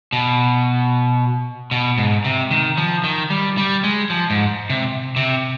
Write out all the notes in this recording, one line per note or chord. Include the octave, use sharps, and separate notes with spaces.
B2
B2
G#2
C3
D#3
F3
D#3
G3
G3
G#3
F3
G#2
C3
C3